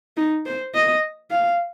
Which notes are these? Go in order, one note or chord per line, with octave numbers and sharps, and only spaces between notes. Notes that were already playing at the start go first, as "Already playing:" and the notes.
D#4
C5
D#5
F5